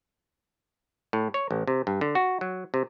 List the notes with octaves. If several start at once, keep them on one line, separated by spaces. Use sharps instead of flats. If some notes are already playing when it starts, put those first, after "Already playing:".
A2
C#5
A1
C3
G2
D3
F#4
F#3
C3